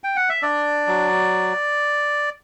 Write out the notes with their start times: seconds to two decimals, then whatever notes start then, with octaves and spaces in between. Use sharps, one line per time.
0.04 G5
0.16 F#5
0.29 E5
0.42 D4 D5
0.87 F#3